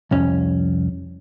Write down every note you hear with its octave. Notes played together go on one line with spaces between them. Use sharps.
C2 F2 C#4